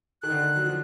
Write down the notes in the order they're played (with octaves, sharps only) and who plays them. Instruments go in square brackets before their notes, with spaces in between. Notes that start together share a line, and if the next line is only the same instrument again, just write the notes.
[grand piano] D#3 [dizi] F#6
[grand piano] D3
D#3
F#3
F3